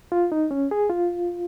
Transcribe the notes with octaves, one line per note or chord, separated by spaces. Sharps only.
F4
D#4
C#4
G#4
F4